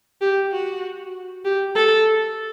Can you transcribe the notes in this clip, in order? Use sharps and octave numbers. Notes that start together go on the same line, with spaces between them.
G4
F#4
G4
A4